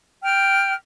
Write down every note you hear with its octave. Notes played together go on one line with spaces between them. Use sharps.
G5 F6